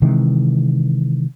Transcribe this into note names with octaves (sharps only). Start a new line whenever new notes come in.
C3 D#3 E3 G#3